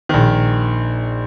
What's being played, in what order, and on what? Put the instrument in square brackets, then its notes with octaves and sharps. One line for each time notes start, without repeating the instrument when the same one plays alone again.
[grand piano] A#1 D#3